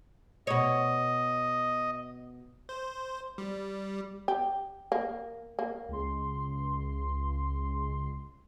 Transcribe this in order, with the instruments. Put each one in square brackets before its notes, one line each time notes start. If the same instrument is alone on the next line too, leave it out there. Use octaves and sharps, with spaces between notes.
[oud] B2 C#5 [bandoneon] D#5
[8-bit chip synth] C5
G3
[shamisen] G4
A#3
A#3
[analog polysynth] C#2 C6